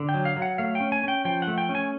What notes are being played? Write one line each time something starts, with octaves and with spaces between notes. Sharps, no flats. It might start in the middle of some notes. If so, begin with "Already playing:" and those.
Already playing: D3
G5
F#3
F5
F#3
F#5
A3 F5
G5
C#4
G#5
C#4 G5
F3 G5
F#5
A3
G5
C#4
G#5